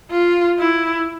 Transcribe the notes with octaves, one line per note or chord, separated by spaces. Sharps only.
F4
E4